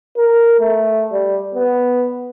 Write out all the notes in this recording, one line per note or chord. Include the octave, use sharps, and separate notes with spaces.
A#4
A3
G3
B3